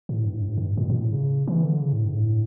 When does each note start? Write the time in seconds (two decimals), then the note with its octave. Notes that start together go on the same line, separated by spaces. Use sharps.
0.09 A2
0.26 G2
0.34 A2
0.41 G2
0.49 A2
0.58 G2
0.77 A#2
0.90 A#2
1.01 A2
1.12 C#3
1.47 E3
1.64 D3
1.81 C#3
1.93 A2
2.05 G2
2.16 A2